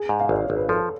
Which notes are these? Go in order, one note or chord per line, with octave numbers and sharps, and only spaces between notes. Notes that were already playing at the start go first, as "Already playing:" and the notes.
Already playing: G#4
G#2
F5
G#1 D5
G#1 C#5
B4
F3 A4